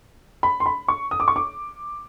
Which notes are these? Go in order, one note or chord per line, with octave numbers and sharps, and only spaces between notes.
B5
C6
B5
C#6
D#6
D6
C#6
D6